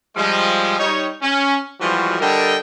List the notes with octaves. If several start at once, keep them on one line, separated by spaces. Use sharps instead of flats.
F3 G3 G#3
G3 D#4 C#5
C#4
E3 F3 G3 G#3 F#4
D3 G3 A4 A#4 D#5 G5